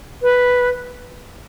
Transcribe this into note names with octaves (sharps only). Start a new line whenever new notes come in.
B4